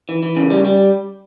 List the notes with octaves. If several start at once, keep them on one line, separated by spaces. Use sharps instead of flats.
E3
E3
C#3
G3
G3